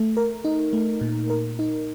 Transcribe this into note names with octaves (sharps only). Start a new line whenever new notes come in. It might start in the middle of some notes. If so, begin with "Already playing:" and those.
Already playing: A3
A#4
D#4
A3
A#2
A#4
D#4